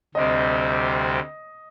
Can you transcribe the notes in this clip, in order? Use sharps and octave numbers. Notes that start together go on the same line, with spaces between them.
D2 C3 G3 C4 D#5